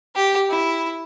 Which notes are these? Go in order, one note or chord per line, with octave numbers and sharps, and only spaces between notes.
G4
E4